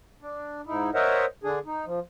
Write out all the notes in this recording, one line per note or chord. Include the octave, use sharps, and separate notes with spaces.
D4
G#2 D#4 E4
A#4 C5 C#5 D#5 E5 F#5
D3 D4 G#4
D#4
F3